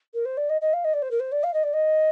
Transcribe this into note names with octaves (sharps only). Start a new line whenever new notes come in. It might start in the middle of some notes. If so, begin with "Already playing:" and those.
A#4
C5
D5
D#5
D#5
F5
D#5
D5
C5
A#4
C5
D5
F5
D#5
D5
D#5